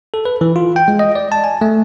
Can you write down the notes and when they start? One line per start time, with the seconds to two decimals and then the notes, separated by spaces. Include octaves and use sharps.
0.14 A4
0.25 B4
0.41 E3
0.56 F4
0.76 G5
0.88 G#3
0.99 D#5
1.15 D5
1.32 A5
1.44 G#5
1.61 A3